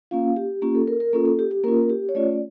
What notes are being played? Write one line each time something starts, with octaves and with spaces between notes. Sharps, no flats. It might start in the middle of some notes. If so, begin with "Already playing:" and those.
A#3 C#4 F4 F5
G4
A#3 C#4 F4 G4
A4
A#4
A#4
A#3 C#4 F4 A4
A4
G4
G4
A#3 C#4 F4 A#4
G4
C#5
A3 C#4 F4 D5